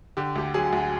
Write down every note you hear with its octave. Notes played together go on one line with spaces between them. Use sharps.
D3 G4
D2 G4
F#3 G#4
D2